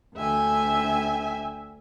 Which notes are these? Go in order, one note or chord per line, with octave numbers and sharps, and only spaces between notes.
D2 E5 G5 G#5